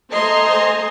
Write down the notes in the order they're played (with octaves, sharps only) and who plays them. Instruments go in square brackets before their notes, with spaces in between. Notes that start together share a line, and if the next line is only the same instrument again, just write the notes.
[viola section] A3 C5 D#5 G#5 A#5 C6